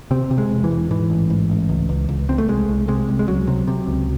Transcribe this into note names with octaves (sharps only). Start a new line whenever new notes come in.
C3 C4
C3
G#3
E1
E3
E1
G#2 E3
A1
G#2
A1
C#2
C#2
C#2
C#2 C4
A3
C2 G#3
C2
C3 G#3
C2
G#3
C#2 F#3
C3
C3
C#2